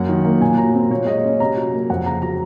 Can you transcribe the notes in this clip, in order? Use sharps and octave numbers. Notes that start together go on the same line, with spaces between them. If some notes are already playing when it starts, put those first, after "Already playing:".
Already playing: F#2 A#3 F#5
D#3
A#3
A#2 G#5
F#3 A#5
C4
A#2 C#5
G#3 D#5
C#4
C3 A#5
F#3
A#3
F2 F#5
C#3 A#5
F#3 A#5